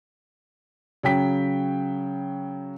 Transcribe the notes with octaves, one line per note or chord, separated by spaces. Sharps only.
C#3 F#3 G5 B6